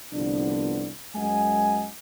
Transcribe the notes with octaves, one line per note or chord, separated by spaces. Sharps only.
G1 C2 D3 F3 B3 D4
F#2 G#3 D#5 F#5 G#5